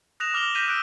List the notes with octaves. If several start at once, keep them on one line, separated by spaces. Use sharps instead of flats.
D#6 F#6 A#6 E7 F7
D6 F6 A#6 F7 G7
F6 G6 A#6 B6 D#7 F7
D6 E6 F#6 G6 D7